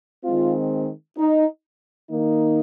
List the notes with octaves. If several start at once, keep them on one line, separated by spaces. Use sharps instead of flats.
D#3 G#3 C4 F4
D#4
D#3 A#3 D#4